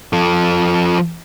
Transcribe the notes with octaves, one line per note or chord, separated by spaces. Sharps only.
F3 A4